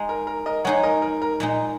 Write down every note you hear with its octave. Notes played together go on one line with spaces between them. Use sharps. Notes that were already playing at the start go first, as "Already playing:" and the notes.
Already playing: G#3 D#4 G#4
A#4
A#4
A#4 D#5
G#3 D#4 G#4 C#5 F#5
A#4 D#5
A#4
A#4
A#2 G#3 D#4